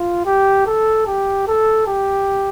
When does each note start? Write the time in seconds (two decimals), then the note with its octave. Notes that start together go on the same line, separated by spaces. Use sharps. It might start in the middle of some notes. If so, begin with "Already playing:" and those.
Already playing: F4
0.26 G4
0.66 A4
1.07 G4
1.48 A4
1.87 G4